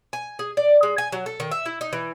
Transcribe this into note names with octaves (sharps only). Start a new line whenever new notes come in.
G#5
G#4
D5
G#3
G#5
F#3
A4
D#3
E5
E4
D#4
E3